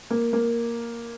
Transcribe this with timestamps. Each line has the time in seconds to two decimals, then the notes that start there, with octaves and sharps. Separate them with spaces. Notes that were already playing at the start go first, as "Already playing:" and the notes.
0.10 A#3
0.33 A#3